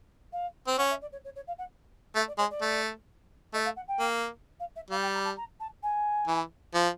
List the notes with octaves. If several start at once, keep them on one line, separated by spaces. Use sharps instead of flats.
F5
C4
C#4 F#5
E5
D5
C#5
C#5
C#5
F5
F#5
A3 E5
D5
G#3 C#5
D5
A3
A3 D#5
F5
F#5
G5
A#3
F5
E5
G3 F5
G5
A#5
A5
A#5
A5
G#5
E3
F3